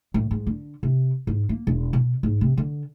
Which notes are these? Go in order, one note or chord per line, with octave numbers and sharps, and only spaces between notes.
A2
G#2
D3
C3
G#2
A#3
E1
B2
G#2
C3
D3